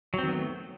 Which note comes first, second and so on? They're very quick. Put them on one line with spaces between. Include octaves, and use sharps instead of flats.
F#3 C4 D#3 B3 A3